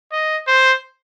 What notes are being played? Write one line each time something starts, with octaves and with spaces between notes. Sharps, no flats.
D#5
C5